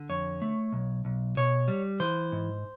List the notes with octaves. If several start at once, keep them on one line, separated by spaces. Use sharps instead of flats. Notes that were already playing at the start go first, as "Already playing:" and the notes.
Already playing: D3
F2 C#5
A3
B1
B1
B2 C#5
G3
E3 C5
G#2